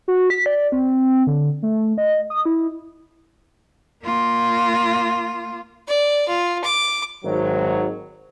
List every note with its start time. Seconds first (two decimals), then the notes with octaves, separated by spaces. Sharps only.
0.08 F#4
0.30 B6
0.46 D5
0.72 C4
1.27 D3
1.63 A3
1.98 D#5
2.30 D#6
2.46 E4
4.04 A#3 F4
5.88 D5
6.28 F4
6.64 D6
7.24 G#1 F#3